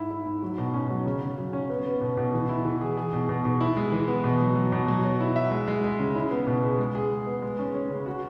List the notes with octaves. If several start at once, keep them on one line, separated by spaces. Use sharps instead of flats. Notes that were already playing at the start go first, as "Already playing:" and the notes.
Already playing: G#2 E4
E4
G#2
F#3
B2
C#4
F#3
C#3
C#3
F#3
C#4
B3
B3
B2
B2
E3
E4
E3
G#4
G#4
B2
B2
B2
E4
G#3
E3
B3
B2
F#3
F#3
B2
F#3
F#3
E4
E5
G#3
G#3
G#3
C#3
E4
B3
B2
G#4
G#3
G#4
G#3
B3
G#3
C#4
C#4
C#3
F#4